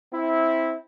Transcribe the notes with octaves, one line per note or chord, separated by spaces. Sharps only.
C4 E4